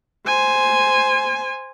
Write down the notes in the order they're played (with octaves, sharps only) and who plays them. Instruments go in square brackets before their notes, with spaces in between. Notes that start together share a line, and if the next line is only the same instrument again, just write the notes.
[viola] C5 G#5